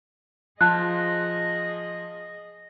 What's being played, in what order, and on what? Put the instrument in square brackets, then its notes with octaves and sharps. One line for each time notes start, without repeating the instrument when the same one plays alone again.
[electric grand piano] F3 F4 [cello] G#4 D#5 [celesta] A5 F#6